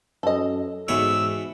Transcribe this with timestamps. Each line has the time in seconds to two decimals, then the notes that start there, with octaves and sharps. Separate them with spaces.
0.23 F#2 A4 D#5
0.88 E2 G#2 B2 C#5 E6